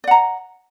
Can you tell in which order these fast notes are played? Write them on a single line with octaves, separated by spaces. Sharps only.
D5 F#5 A#5